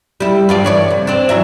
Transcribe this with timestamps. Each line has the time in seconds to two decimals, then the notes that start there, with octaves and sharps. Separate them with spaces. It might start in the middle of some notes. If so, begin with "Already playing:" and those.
0.20 G3 E4
0.49 G2 F4 D5
0.64 E3 C#5 D5
0.90 C3
1.07 C4 D4
1.29 E3 F#3 E5